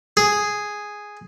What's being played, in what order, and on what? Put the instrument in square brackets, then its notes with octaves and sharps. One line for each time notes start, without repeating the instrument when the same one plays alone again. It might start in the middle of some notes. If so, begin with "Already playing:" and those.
[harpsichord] G#4